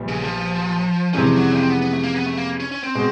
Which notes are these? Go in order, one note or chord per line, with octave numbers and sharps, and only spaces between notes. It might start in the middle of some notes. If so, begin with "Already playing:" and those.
Already playing: A#1 A#2 G3 B3
C#3
F3
F2 C3 E3 F3 G#3 C#4
F#3
C4
B3
B3
A3
A#3
B3
A3
A#3
C#4
C#4
C4
B2 G#3